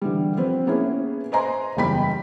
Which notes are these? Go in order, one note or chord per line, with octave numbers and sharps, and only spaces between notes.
D3 E3 G3
F3 C4 B4
A#3 B3 C#4 E4 G#4
B4 C5 D#5 G#5 A#5 C6
F#1 E2 G3 G5 B5 B6